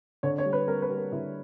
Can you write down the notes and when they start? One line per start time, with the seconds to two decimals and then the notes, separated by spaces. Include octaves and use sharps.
0.23 D3 C#5
0.38 C#5
0.46 G3
0.53 B4
0.67 G3 A#4
0.82 B4
0.90 G3
0.97 A#4
1.12 D3 E4